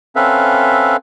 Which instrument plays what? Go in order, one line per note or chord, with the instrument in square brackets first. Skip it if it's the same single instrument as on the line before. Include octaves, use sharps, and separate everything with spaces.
[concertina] C4 C#4 A4 B4 E5 F5